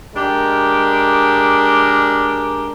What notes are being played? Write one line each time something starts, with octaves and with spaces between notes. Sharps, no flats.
G#3 D4 G4 A#4